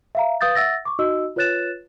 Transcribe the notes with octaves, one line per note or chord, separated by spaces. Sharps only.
E5 F5 A#5
B4 F5 D#6 G6 A6
E5 F#5 E6 A6 A#6
C#6 D6
D#4 F#4 D#5 E6
F4 B4 C#5 F#6 A6 E7